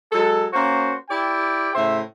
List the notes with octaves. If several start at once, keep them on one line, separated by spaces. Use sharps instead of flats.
F#3 G#3 A4
A#3 C#4 F#4 C5
E4 G4 D5 G5
A2 C#3 C5 E5